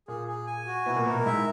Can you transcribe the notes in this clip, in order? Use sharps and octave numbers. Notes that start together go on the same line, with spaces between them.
A#2 A#3 G#4
G#4
G#5
F#4
B2 B3 E4
A#2 A#3
B2 B3 A#4
A#2 A#3
G#2 G#3 E5